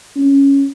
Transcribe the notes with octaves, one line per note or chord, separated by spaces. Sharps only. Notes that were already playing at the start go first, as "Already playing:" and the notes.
C#4